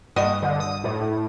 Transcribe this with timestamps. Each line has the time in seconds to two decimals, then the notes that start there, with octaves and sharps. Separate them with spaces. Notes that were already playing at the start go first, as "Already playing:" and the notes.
0.16 G2 F#4 D#5 D#6
0.42 D3
0.60 D#6
0.84 A2